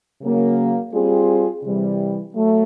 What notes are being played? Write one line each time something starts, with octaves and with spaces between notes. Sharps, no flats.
C#3 F#3 A#3
G3 C4 F4 G#4
C3 E3 G3
F#3 A3